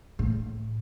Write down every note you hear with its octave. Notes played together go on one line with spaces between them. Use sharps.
A2